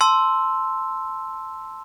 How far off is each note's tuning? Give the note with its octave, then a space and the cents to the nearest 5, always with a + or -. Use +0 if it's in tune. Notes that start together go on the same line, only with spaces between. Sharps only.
A5 +0 C6 +0 E6 +0